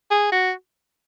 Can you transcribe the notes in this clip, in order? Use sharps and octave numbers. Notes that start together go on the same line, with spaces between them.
G#4
F#4